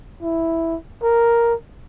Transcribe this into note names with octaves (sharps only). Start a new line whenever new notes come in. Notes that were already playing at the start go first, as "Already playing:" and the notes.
E4
A#4